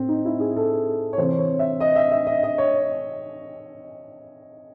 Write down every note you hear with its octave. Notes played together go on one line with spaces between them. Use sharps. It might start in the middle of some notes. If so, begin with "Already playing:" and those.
Already playing: A2 C4
D#4
E4
G#4
A4
C#5
C3 E3 C5
C#5
E5
D#5
E5
E5
D#5
D#5
C#5